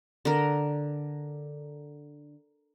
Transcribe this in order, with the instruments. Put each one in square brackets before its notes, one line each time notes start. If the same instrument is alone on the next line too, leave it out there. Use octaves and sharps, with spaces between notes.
[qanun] D3 A#4